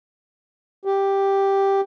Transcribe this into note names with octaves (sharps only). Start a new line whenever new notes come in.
G4